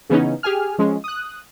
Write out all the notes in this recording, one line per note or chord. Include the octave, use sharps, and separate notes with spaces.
C#3 E3 B3 C#4 D#4
G4 G#4 G#5 F6
F3 G#3 C#4
D#6 F#6